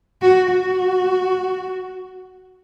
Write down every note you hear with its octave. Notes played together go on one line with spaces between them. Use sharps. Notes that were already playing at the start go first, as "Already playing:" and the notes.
F#4
F#4